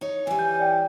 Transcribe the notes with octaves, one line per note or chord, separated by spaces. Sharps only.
D#4 C#5
E3 G3 G#5
G6
D5 G5